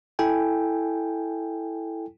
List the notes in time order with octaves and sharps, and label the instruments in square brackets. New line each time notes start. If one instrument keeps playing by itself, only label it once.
[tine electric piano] E4 A4 G5 G#5